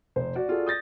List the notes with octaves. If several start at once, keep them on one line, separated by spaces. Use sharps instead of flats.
F1 C5
F#4 D5
F4 F#4 G#4 A4 D5
D#6 G6 A6 A#6